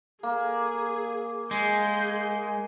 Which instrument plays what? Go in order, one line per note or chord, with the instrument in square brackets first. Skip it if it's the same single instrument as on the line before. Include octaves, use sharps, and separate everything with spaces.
[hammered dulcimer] A#3 [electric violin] G#4
[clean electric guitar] G#3 [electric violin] G#4 G6